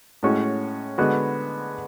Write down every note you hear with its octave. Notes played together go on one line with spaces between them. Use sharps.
A2 G#3 C#4 F#4 C#5
D3 G#3 B3 F#4 B4